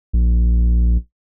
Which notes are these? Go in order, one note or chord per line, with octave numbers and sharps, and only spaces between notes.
A#1